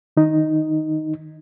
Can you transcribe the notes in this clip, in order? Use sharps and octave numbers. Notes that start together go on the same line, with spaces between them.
D#3 D#4